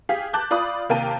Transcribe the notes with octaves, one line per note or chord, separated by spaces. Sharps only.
G4 G#4 F5 B6
A5 D6 F#6 G6
F4 D5 B5 D#6
D#2 C3 A#3 G5 A5 D#7